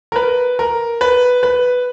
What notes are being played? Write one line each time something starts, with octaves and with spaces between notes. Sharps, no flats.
A#4
B4
A#4
B4
B4